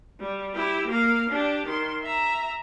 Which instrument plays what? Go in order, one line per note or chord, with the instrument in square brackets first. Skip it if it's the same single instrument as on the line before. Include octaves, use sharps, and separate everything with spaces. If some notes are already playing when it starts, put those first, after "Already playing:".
[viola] G3
E4 G4
A#3 F5
D4 G4
D#3 C6
E5 A#5